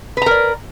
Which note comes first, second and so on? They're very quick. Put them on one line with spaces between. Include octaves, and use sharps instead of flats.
B4 A#5 A#4 D5